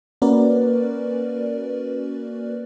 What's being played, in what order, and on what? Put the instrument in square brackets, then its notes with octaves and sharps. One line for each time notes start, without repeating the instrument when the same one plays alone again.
[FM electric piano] A#3 C#4 F#4 A#4 B4 D5